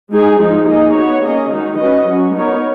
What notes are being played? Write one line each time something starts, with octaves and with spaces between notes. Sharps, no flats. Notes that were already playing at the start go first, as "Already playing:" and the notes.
G#3 D#4 G#4
F3 G#3 D#4
A#3 D#4 G#4 D#5
B3 F#4 C#5
A#3 C#4 G#4 D#5
D#3 G#3 D#4 F#4
C#4 F#4 B4 D#5
F#3 C#4 F#4
B3 D#4 A#4 C#5